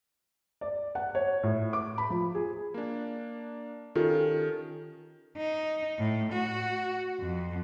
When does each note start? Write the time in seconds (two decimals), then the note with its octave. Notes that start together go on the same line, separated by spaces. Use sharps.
0.61 D5
0.95 F#5
1.15 C#5
1.43 A2
1.73 D6
1.98 B5
2.10 F3
2.35 G#4
2.74 A#3 D4
3.95 D#3 C#4 F4 G4 A4
5.37 D#4
5.99 A2
6.32 F#4
7.20 F2